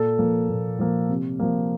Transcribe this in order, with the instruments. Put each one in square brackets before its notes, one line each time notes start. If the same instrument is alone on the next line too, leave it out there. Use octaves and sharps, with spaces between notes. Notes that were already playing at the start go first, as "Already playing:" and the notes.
Already playing: [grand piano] A#2 A4
F3 A#3
A#2
F3 A#3
C3
F3 A#3